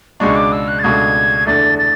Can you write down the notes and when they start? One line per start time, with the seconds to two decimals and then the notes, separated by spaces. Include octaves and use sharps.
0.20 C#2 B2 G#3 D4 C#6
0.36 D6
0.52 E6
0.68 F#6
0.79 A6
0.83 C#2 B2 A3 D4 G#6
1.47 E2 D3 A3 D4 A6
1.78 A6